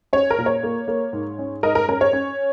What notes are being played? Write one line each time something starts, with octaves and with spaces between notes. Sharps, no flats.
C#4 C#5
A#4
A#2
C#5
A#3
A#3
G#2
C#4
G#2 A#4 D#5
A#4
C#4 A#4
C#5
C#4